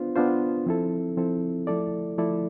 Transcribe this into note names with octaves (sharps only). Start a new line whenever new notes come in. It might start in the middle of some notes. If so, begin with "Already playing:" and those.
Already playing: B3 D4 F4 C5
B3 D4 F4 C5
F3 C4 E4 A4
F3 C4 E4 A4
F3 A3 E4 A4 D5
F3 A3 E4 A4 D5